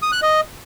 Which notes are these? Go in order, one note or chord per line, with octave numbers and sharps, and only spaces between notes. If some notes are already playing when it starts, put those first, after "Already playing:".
D#6
F#6
D#5